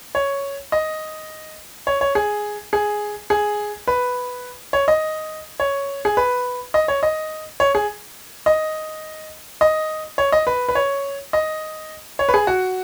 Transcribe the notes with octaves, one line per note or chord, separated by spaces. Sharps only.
C#5
D#5
C#5
C#5
G#4
G#4
G#4
B4
C#5
D#5
C#5
G#4
B4
D#5
C#5
D#5
C#5
G#4
D#5
D#5
C#5
D#5
B4
B4
C#5
D#5
C#5
B4
G#4
F#4